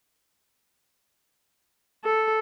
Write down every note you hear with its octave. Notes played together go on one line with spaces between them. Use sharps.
A4